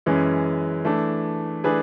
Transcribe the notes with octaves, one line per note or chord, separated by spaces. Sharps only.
F#2 E3 G#3 C#4
E3 A3 D4
E3 A3 D4 G#4 B4